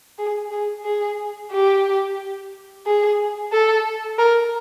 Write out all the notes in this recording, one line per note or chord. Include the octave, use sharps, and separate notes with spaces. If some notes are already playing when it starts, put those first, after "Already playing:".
G#4
G#4
G#4
G4
G#4
A4
A#4